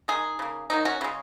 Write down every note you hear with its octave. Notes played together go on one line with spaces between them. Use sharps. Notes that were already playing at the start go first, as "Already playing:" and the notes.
D#3 G#3 D#4 G#4
C#3 A#3
D#3 F#3 A#3 D#4
C#4 F#4
C#3 G#3 C#4